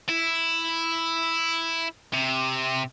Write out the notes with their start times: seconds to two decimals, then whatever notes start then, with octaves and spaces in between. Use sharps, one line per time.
0.09 E4
2.13 C3